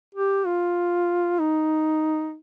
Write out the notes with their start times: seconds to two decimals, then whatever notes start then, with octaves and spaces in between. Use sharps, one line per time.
0.15 G4
0.46 F4
1.40 D#4